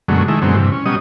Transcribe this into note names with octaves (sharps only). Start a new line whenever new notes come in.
F#2 B2 D3 F#3 G#3 A3
D#3 G#3 A3 E4
F#2 B2 D3 F#3 G#3 C4
G2 C3 E3
C#4
B2 F#3 G3 C#4 D#5 D#6